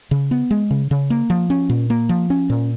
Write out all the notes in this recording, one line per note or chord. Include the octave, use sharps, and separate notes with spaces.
C#3
B3
G#3
C#3
C#3
A#3
F3
C#4
A#2
A#3
F3
C#4
A#2